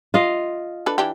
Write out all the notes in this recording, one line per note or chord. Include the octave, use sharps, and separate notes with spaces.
F4 D#5 F5
D4 A4 B4
E3 D4 G4